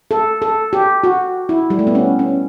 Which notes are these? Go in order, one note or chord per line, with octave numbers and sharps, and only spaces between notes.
A4
A4
G4
F#4
E4
G3
A3
B3
C#4
C#4